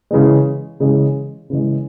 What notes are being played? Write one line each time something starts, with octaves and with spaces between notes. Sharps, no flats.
C#3 E3 G#3
C#3 E3 G#3
C#3 E3 G#3